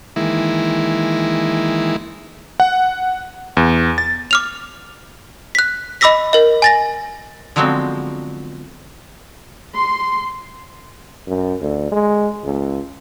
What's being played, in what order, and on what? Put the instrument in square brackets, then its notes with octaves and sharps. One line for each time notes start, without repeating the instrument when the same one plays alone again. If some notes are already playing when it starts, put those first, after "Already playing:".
[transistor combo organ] D#3 E3 G#3 A#3 E4
[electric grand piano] F#5
E2
A6
[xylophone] D6 F6 F7
F#6 B6
D#5 B5 D6 E6 A#6 B6
A#4 D#5
G#5 A6 A#6
[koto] D3 F3 F#3 G#3 B3 C4
[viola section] C6
[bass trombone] F#2
D2
G#3
C#2